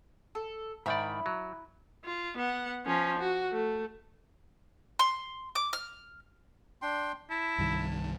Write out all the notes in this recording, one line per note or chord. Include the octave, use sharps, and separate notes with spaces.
A4
G#2 D#3 E4 D5 B5
F#3
F4
B3 F#5
F3 C#4
F#4
A3
C6
D6
F6
D4 G5 C6
E4 A5
C2 G2 D#3